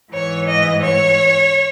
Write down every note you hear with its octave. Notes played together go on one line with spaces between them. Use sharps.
G#2 E3 C#5
D#5
C#5